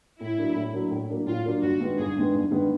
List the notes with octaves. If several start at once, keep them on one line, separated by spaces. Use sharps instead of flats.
A2 E4
F#3 A#3 D4
A2
F#3 A#3 D4
A2
F#3 A#3 D4
A2 F4
F#3 A#3 D4
G1 F#4
G2 D#3 G#3 B3
G1 G#4
G2 D#3 G#3 B3
G1
G2 D#3 G#3 B3